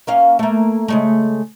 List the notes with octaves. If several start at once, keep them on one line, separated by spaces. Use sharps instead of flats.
A#3 C#4 F5
A3 A#3
C#3 G#3 A3